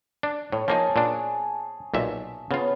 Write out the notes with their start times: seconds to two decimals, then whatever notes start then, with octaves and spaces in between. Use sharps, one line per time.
0.23 D4
0.52 A2 C#5
0.68 F3 A#3 D#4 G#4 G#5 A5
0.96 A#2 D4
1.94 B1 A#2 E5
2.51 C#3 B3 C#4 F4